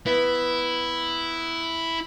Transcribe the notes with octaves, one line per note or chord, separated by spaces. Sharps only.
B3 E4